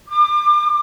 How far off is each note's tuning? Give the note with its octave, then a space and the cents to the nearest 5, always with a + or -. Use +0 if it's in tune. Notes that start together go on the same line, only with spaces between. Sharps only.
D6 +35